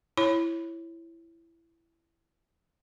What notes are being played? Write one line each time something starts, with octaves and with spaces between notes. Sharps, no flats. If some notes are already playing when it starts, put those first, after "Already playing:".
E4 C#5 B5